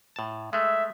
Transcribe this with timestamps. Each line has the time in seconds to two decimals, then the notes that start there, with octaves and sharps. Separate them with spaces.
0.16 A2 A5
0.53 G#3 A3 E5